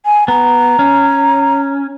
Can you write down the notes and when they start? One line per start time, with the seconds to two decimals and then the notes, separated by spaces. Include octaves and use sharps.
0.06 G#5
0.28 B3 A#5
0.79 C#4